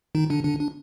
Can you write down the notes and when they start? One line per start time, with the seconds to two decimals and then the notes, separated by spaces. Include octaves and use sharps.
0.15 D#3 D#4
0.30 D3 D4
0.44 D3 D4
0.60 D4